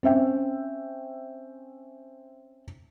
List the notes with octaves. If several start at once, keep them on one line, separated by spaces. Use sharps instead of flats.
C4 C#4 E5 G5